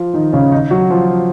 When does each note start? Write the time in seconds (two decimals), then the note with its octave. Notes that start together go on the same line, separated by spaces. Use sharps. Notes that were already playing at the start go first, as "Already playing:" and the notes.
Already playing: F3 F4
0.14 D#3 D#4
0.33 C#3 C#4
0.52 D#3 D#4
0.71 F#3 F#4
0.90 F3 F4